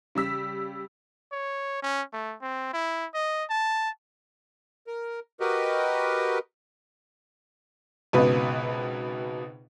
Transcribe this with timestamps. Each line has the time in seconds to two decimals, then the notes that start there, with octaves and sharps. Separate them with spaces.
0.15 C#3 G3 E6 B6
1.32 C#5
1.82 C#4
2.13 A3
2.42 C4
2.74 E4
3.14 D#5
3.50 A5
4.87 A#4
5.40 F#4 G4 A#4 B4 D#5
8.13 G#1 C#2 B2 B4